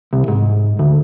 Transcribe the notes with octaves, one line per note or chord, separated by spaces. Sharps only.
C2
G#2
D2